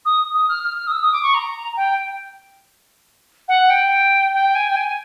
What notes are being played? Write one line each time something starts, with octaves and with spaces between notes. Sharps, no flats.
D#6
D#6
F6
F6
F6
D#6
E6
D#6
D6
C#6
A#5
G5
F#5
G5
G5
G#5
G5
G#5